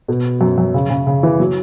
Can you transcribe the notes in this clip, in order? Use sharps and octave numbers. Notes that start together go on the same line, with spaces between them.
B2
F#2
F#2
C#3
C#3
C#3
E3
F#3